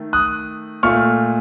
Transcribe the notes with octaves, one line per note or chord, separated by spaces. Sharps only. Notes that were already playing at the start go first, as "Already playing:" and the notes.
Already playing: D#3 A3
D#6 F#6
A#2 A3 C#6 F6